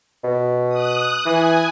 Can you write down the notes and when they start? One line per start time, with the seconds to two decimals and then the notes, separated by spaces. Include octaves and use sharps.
0.24 B2
0.68 D#6 F#6
1.26 E3 G#5